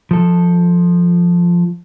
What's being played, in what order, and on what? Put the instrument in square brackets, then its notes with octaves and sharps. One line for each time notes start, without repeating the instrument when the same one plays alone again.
[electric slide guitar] F3 A4